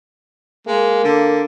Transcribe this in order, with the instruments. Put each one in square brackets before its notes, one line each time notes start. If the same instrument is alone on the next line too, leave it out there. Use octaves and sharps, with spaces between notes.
[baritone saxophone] G#3 [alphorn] A#3
[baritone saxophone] D3